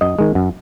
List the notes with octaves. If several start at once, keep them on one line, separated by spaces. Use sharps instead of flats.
F#2 D#5
D#3 G#3
F#2